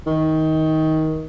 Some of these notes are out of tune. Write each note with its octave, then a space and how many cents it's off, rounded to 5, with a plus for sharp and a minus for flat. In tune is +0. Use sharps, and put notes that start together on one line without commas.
D#3 +20